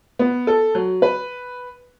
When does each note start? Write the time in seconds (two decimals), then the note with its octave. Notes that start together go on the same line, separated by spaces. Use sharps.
0.19 B3
0.47 A4
0.75 F#3
1.02 B4